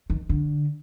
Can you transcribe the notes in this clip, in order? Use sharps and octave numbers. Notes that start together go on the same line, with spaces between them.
D#3
D3